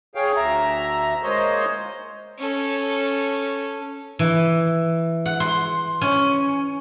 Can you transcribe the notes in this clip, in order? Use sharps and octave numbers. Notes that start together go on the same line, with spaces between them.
G#4 C#5 F5 G5
D2 E5 A#5
G#3 A#3 C5 C#5 D#5
C#4 A4
E3
F#5
C6
C#4